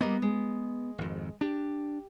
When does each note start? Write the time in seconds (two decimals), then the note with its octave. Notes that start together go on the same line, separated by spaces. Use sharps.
0.01 G3 A#3 B3 D#5
0.22 G#3
0.98 G#1 F2
1.41 D4 G4